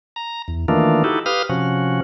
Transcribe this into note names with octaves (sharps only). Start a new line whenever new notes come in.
A#5
E2
D#3 E3 A3 A#3 D4 F4
D#4 E4 F#4 G4 A4
G4 B4 F5 D#6 F6
C3 F3 C#4 F#4